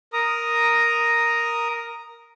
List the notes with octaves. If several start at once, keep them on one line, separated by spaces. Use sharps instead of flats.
A#4 A#5 D#6